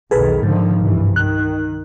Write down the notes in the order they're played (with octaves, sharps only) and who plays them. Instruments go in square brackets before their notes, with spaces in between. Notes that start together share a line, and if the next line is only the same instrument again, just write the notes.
[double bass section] B1 E2 D#3 [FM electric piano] G#4 A4 B4
[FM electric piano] G#2 [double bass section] D3 D#3 F3
[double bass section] C2 G2 E3
[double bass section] D#3 [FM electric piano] F#6